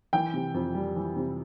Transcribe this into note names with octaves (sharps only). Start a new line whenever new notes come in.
E3 G5
C3
F2
G3
E3
C3